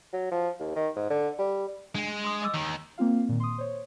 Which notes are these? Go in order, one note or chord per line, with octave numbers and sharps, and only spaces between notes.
F#3
F3
D#2
D#3
G#2
D3
G3
G#3 D4 G#5
C6 D#6
D#5 D6 E6
D#2 D#3
A#3 C4 F4 F5
A#2 D#3
C6 D#6
C5 C#5